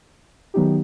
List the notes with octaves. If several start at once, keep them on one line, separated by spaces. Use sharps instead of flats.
D#3 F#3 B3 D#4 G4